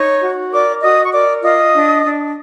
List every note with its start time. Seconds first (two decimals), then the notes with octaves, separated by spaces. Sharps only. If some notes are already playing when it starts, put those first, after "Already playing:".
Already playing: D#4 C#5 C#6
0.21 F#4
0.51 A#4 D5 D6
0.81 F#4 D#5 D#6
1.04 C#6
1.12 A#4 D5 D6
1.43 F4 D#5 D#6
1.73 D4
2.05 D4